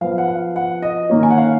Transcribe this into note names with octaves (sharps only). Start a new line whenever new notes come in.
F3 B3 F5
F#5
F5
F#5
D#5
D#3 A#3 C#4
G#5
F#5
F5